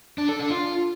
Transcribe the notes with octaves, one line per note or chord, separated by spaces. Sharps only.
D4
A4
D4
F4